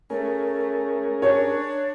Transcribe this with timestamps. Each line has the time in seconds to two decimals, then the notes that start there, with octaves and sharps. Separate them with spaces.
0.10 A3 C#4 G#4 A#4
1.22 D4 C#5